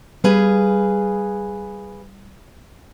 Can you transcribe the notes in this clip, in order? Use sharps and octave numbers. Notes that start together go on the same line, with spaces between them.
G3 G#4 B4 F5